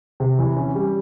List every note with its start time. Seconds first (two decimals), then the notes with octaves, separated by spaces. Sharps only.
0.20 C3
0.39 E3
0.57 C#4
0.75 G3